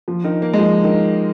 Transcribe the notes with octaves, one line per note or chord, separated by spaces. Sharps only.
F3
D#3
A#3
G#3
F3
D#3